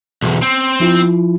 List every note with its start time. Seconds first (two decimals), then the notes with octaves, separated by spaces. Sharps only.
0.22 B1 E2
0.42 C4
0.80 F3 E4 F4